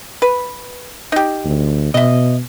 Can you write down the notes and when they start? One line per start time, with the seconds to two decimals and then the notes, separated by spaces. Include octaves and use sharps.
0.22 B4
1.12 D#4 G4
1.45 D2
1.94 B2 D#5 E5